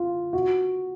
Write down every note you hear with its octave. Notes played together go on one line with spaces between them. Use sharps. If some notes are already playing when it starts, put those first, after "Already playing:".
Already playing: F4
F#4